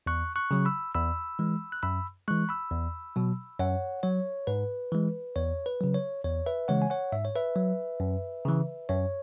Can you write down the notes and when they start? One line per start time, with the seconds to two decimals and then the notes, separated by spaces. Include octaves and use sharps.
0.06 E2 C#6 F#6
0.36 C#6 F#6
0.51 C#3 F#3
0.65 B5 E6
0.95 E2 B5 E6
1.39 E3 G#3
1.72 F#6
1.83 F#2 B5 E6
2.28 E3 G#3 C#6 F#6
2.49 B5 E6
2.71 E2
3.16 B2 F#3
3.59 F#2 C#5 F#5
4.03 F#3 C#5
4.47 G#2 B4
4.92 E3 G#3
5.36 E2 C#5
5.66 B4
5.81 C#3 F#3
5.94 C#5
6.24 E2 C#5
6.46 B4 E5
6.68 C#3 E3 G#3 C#5 F#5
6.82 G#5
6.90 C#5 F#5
7.12 G#2 E5
7.25 C#5
7.36 B4 E5
7.56 F#3
8.00 F#2
8.45 C#3 E3
8.89 F#2 C#5